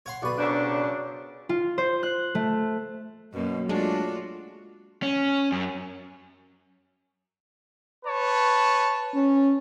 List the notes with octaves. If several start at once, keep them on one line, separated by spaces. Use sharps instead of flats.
C#5 F#5 C6
B1 F#4 B4 D5 C#6
C#3 F#3 D4 C5
A#4
F4
C5
F#6
A3
F#2 B2 F#3 A#3
G#3 A3 D4 F4 F#4
C#4
F#2
B4 C#5 A5
C#4